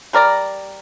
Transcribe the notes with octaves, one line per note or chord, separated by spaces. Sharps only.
G3 A#4 D5 A#5